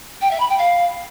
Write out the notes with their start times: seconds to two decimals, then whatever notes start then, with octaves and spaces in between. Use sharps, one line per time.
0.21 G5
0.30 E5
0.39 B5
0.49 G5
0.58 F5